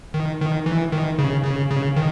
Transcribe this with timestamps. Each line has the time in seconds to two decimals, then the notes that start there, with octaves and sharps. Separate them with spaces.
0.14 D#3
0.40 D#3
0.66 E3
0.92 D#3
1.18 C#3
1.44 C#3
1.71 C#3
1.96 D#3